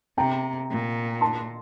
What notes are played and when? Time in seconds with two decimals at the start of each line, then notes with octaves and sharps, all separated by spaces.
0.17 C3 G5 A#5
0.70 A#2
1.21 A5 C6